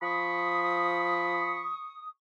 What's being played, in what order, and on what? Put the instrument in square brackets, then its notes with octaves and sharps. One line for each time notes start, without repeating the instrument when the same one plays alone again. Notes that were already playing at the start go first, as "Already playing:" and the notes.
[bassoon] F3 [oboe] B5 [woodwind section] C#6 D#6